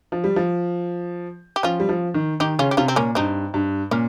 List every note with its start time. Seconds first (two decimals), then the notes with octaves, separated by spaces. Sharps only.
0.12 F3
0.24 G3
0.36 F3
1.56 G4
1.63 F3 C#4 F4
1.80 G3
1.89 F3
2.14 D#3
2.40 D#3 D#4 G4
2.59 C#3 C#4 F4
2.71 G4
2.77 C3 C#4 F4
2.88 C4
2.96 A#2 A#3 C#4
3.15 G2 C4 D#4
3.54 G2
3.91 A#2 A#3 C#4